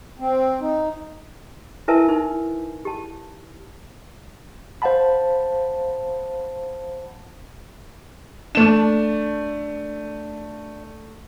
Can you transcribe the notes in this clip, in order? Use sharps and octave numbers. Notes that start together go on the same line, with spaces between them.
C4
D#4
E4 A#4 B4 E5 G#5 A5
D#4
G4 A5
C5 F5 F#5 A5 B5
A3 D4 E7